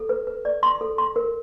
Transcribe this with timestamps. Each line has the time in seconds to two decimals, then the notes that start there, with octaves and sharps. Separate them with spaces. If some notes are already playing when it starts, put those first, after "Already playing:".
Already playing: A4
0.09 B4
0.27 B4
0.45 D5
0.63 C6
0.81 A4
0.98 C6
1.16 A#4